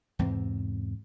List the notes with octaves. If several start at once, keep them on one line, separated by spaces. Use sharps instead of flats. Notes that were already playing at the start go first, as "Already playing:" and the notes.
E2 G#2 C3 C4